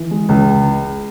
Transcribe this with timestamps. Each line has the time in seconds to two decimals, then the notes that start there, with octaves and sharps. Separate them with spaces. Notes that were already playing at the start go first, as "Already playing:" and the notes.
Already playing: E3
0.11 G#3
0.29 C#2